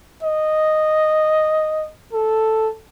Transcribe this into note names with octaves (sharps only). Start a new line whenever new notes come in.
D#5
A4